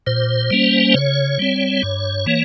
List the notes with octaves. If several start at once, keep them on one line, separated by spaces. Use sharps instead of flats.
A#2 C5
G3 A#3 C#4
C#3 C#5
G3 C4
G2
E3 A#3